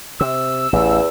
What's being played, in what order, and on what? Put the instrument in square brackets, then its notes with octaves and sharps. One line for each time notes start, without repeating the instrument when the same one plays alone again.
[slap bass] C3 [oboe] E6
[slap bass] A1 [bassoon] E2